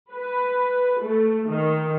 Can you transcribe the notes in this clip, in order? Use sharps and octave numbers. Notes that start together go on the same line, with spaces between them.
B4
A3
D#3